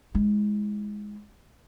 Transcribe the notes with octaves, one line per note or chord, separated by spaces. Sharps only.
G#3 E4